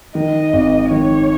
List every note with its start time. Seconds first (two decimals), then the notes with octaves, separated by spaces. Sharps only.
0.15 D#3 D#5
0.53 G#1
0.91 D#3 C#5